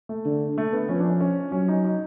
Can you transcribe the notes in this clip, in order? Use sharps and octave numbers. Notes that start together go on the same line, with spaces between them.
A3
D3
A3
B3
F3 C#4
D4
C#4
C#4
F#3 C#4
D#4
D#4